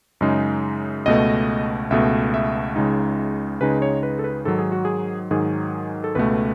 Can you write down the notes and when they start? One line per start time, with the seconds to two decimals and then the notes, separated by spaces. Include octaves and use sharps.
0.21 F#2 C#3 G#3 D#4
1.06 C#2 B2 A3 D#5
1.91 C#2 B2 A3 E5
2.34 E5
2.76 C#2 C#3 G#3 D#4
3.60 C#2 C#3 G#3 D#4 B4
3.82 C#5
4.03 B4
4.19 A4
4.24 B4
4.45 G#2 D#3 F#3 A4
4.59 G#4
4.72 F#4
4.85 G#4
5.31 G#2 D#3 F#3 G#4
6.04 A4
6.15 C#2 B2 A3 B4